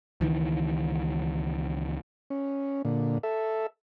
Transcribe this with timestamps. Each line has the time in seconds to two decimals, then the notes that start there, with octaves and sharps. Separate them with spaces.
0.21 C#2 D#3 E3
2.30 C#4
2.85 A#2 D3
3.23 A4 E5